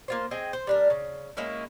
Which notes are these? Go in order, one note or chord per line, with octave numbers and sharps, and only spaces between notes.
A#3 F4 C5
C4 G#4 D#5 G5
C5
G3 D4 A#4
C#3
G#3 A#3 C#4 E4